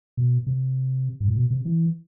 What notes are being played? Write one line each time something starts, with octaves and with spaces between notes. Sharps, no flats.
B2
C3
G2
A2
B2
C3
E3